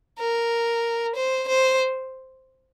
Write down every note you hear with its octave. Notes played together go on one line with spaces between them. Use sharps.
A#4
C5
C5